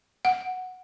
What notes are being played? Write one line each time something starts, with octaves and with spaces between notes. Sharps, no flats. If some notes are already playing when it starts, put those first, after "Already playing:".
F#5